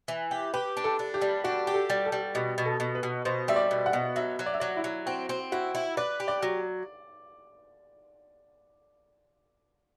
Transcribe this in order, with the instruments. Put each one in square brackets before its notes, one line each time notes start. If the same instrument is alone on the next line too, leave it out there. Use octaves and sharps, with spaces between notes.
[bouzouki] E3
G4
[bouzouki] G4 [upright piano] B4
[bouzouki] D4
[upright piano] A4
[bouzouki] D4
[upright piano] G4
[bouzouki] G3
[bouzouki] D4 [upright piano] F#4
[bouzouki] G4
[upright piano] A4
[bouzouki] G3
[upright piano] A4
[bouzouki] G3
[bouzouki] B2 [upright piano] G4
[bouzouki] B2
[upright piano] A4
[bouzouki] B2
[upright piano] B4
[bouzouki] B2
[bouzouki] B2 [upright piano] C5
[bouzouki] G3 [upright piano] E5
[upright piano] D5
[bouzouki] B2
[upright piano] F#5
[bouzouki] B2
[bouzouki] F#3 [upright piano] E5
[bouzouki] F#3
[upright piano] D5
E5
[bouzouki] F#3 [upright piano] D5
[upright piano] E4
[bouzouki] F#3
[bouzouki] C4 [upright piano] F#4
[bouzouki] C4
[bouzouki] E4 [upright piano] F#4
[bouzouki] E4
[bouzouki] B4 [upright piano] D5
[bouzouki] G4
[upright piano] D5
[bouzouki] F#3